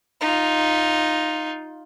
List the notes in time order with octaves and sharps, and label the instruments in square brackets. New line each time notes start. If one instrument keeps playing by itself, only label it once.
[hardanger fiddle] D#4 F4